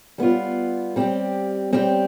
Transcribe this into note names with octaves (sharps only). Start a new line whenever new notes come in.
G3 B3 F4
G3 C4 G4
G3 C4 G4